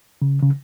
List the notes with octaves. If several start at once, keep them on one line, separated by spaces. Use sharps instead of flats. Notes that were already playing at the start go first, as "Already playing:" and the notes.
C#3
C#3